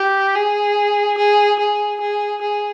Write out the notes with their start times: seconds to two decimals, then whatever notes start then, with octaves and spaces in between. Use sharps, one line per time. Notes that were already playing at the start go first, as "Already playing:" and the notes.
Already playing: G4
0.35 G#4
1.17 G#4
1.59 G#4
2.00 G#4
2.41 G#4